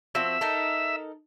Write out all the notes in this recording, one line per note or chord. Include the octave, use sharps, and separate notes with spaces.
F3 C4 F#4 E5
D#4 A4 A#4